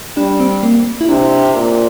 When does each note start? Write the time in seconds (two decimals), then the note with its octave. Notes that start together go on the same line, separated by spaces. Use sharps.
0.17 G3 D4
0.40 C4
0.63 A#3
1.01 E4
1.09 C3 D4
1.55 A#2